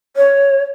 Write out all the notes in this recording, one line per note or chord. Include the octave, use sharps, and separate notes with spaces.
C#5